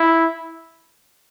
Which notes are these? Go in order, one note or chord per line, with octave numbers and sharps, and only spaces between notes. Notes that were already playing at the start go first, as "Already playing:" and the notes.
Already playing: E4